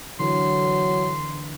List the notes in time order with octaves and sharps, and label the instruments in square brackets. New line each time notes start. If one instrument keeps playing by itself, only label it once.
[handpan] D3 E3 [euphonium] F#3 [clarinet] C6